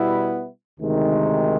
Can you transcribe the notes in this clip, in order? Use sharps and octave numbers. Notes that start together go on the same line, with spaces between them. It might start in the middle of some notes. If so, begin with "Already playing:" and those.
Already playing: B2 G3 B3 E4
D2 C3 D#3 G#3